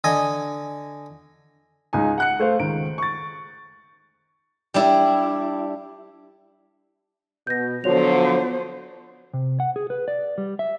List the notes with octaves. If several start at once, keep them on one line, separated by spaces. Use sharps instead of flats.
D3 D#5 G#5
C#2 D#4 G#5
F#5 F#6 C#7
A3 C5 F5
C#2 D#3 D7
C#6 A6
G3 D4 E4
B2 G6 A#6
D3 F3 F#3 B3 F#4 C5 C#5 F7
C3
F#5
G#4
B4
D5
G3
E5